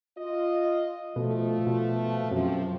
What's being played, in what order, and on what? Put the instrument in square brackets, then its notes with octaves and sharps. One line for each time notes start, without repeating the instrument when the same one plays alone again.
[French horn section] F4 D#5
[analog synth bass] B2 [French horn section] F3 A3
[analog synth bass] B2
[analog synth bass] F#2 [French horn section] C3 F3